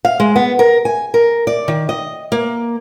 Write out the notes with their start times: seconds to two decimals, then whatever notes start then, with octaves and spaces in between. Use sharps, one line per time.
0.05 F5
0.20 G#3
0.36 B3
0.59 A#4
0.85 G#5
1.14 A#4
1.47 D5
1.68 D#3
1.89 D#5
2.32 A#3